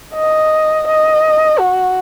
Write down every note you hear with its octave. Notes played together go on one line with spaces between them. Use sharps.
D#5
D#5
F#4